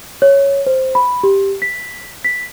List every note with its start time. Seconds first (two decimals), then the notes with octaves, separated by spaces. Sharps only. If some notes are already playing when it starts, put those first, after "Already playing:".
0.22 C#5
0.66 C5
0.95 B5
1.23 G4
1.62 B6
2.24 B6